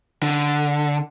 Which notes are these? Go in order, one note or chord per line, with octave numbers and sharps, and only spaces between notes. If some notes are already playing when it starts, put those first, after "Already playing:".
D3